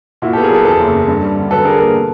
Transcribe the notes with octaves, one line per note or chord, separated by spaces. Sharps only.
A#2 E4 F#4
G4 A4
B3
G#4 A#4
F#3 A4 B4
E2 A4 B4
F#1
C#3
G2
G3
D3
F#3 A4 B4
D4 G#4 A#4
A#3 A4 B4
B2